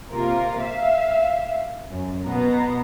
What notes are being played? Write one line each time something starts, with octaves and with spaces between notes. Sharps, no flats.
C3 A#3 F4 A#4
E5 F5
F#2
B2 B3 A#5